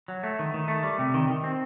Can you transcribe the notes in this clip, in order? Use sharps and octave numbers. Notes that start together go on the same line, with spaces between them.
F#3
A3
D#3
D#3
A3
G3
C3
D#3
D#3
C4